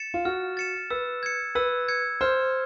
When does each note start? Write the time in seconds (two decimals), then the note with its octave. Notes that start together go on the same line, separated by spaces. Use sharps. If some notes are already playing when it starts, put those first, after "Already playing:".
Already playing: A6 C#7 E7
0.14 F4
0.25 F#4 F6
0.57 A6 C#7 E7
0.90 B4 E6
1.23 G#6 C#7
1.55 B4 E6
1.88 G#6 C#7
2.21 C5 F6